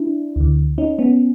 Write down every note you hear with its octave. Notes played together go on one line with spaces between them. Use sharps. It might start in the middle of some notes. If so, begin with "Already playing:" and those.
Already playing: D4 E4
D2 D3
C#4 D#4
B3 C#4